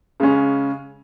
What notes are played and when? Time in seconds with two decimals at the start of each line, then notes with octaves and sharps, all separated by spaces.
0.20 C#3 G#3 C#4